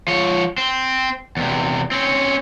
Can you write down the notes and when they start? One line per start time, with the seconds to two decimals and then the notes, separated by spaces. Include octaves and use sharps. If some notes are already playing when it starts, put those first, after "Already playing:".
0.08 F3 C#5
0.58 C4
1.37 E2 C3
1.91 C4 C#4